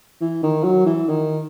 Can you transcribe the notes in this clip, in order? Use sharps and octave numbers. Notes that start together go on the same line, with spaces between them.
E3
D#3
F#3
E3
D#3